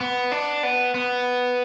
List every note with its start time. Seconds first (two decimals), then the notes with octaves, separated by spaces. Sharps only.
0.01 B3
0.32 D4
0.63 B3
0.95 B3